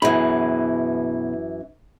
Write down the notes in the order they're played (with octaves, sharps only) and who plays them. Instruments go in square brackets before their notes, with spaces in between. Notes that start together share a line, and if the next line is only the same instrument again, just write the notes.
[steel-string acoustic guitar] F#2 E3 [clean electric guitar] B2 G#4 B5